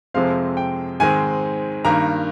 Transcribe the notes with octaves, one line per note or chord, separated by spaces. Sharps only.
F2 C3 F3 G#3 C4 F5
G5
G#2 D#3 G#3 C4 G#5
G2 D#3 A#3 A#5